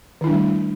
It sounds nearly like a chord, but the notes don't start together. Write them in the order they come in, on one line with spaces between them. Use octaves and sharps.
D#3 E4 D4 G3 A3